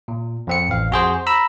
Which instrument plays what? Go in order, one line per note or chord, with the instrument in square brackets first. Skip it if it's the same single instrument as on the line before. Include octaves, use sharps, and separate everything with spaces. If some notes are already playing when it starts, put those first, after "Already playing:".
[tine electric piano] A#2
F2 C4 C#7
A1 F5
F2 F#4 G#4 C5
A#5 B5 E6